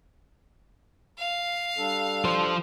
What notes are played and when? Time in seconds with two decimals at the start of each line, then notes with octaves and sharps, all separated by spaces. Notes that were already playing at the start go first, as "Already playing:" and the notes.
1.18 F5
1.78 G3 D4 A4
2.25 F3 C5